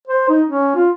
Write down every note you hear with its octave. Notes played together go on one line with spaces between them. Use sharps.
C5
D#4
C#4
F4